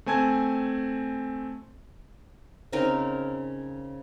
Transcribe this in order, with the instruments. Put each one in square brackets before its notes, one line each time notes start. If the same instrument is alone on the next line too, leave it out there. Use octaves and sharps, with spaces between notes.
[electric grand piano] A3 C4 G#5 A5 G#6
[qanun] C#3 C4 D#4 A#4